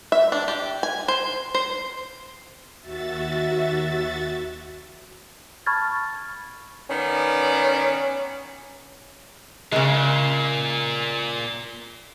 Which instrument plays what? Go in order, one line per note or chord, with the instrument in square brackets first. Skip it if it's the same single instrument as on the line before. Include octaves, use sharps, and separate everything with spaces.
[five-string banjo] E5
D4
G4
G#5
C5
C5
[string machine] D#2 F#4 E5 A6
[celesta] A5 B5 C#6 F6 G#6 A6
[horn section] D#3 B3 D5 [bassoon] C#4
[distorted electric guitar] A#2 [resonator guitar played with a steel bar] C#3 G#3